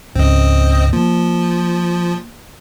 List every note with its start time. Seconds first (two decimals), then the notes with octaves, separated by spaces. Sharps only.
0.15 C#2 G#2 C4 C#4 D#5
0.93 F3 A#3